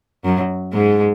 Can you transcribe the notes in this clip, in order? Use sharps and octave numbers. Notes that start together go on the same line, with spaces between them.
F#2 F#3
G#2 G#3